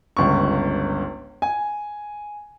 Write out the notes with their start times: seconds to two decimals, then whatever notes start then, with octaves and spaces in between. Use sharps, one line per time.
0.17 G1 C#2 C#6
1.42 G#5